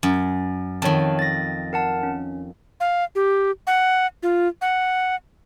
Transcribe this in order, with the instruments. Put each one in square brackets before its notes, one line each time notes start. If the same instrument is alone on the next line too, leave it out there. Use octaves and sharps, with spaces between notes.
[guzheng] F#2
[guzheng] F2 D#3 [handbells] C#5 A5
[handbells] A6 A#6
A#4 F#5 A5
C#4
[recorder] F5
G4
F#5
F4
F#5